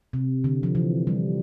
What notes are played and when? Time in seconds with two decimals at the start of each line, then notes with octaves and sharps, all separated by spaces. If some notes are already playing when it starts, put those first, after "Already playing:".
0.13 C3
0.44 D3
0.63 F3
0.75 E3
1.07 G3